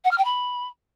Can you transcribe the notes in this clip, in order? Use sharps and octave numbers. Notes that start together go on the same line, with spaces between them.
F#5
F6
G5
B5